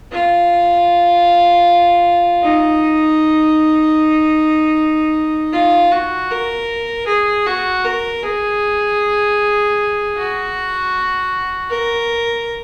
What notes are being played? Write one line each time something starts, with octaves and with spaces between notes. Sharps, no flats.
F4
D#4
F4
F#4
A#4
G#4
F#4
A#4
G#4
F#4
A#4